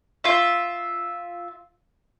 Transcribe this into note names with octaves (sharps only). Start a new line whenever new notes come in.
F4 E5